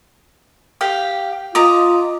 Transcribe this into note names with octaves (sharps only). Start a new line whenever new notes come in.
G4 F5 G5
F4 D#5 A#5 D6